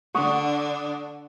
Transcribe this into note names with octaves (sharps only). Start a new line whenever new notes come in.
D3 D4 F#5 C#6 D#6